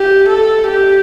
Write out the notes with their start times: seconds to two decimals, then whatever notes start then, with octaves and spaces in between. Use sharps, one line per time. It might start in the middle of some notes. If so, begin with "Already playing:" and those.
Already playing: G4
0.29 A4
0.68 G4